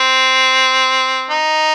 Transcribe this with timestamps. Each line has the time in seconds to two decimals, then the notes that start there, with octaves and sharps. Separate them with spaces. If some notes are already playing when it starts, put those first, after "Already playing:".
Already playing: C4
1.30 D#4